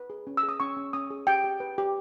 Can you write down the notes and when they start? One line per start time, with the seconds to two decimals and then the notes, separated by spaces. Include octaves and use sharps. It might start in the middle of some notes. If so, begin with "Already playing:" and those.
Already playing: B4
0.10 G#4
0.27 C#4
0.37 E6
0.43 G#4
0.49 D#6
0.60 C#4 C#6
0.77 C#4
0.93 C#4 D#6
1.11 G#4
1.27 G4 G5
1.44 G4
1.60 B4
1.78 G4